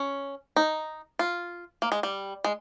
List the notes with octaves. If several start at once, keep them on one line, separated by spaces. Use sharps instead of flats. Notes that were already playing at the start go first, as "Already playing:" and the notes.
Already playing: C#4
D#4
F4
A#3
G#3
G3
G#3